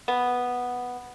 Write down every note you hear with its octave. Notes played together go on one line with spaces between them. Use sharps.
B3